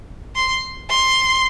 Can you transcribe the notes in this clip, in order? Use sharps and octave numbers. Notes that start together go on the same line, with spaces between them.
C6
C6